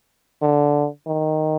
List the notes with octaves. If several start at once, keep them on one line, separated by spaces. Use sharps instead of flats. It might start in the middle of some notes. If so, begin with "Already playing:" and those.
D3
D#3